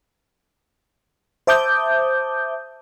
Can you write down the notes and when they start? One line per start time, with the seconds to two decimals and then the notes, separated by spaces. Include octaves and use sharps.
1.47 C5 E5 A5 D6 D#6 G6